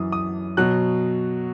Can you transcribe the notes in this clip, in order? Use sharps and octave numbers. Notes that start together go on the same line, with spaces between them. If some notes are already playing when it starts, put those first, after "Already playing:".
Already playing: F#2 E3 D#6
D#6
B2 F#3 F#6